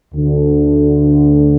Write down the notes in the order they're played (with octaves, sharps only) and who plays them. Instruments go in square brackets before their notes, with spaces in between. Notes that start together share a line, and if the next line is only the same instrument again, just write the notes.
[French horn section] D2 D3